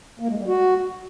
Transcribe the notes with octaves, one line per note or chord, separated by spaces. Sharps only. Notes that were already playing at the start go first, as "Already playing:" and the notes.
A#3
G#3
G3
F#4